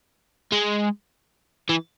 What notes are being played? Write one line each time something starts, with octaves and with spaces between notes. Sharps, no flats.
G#3
E3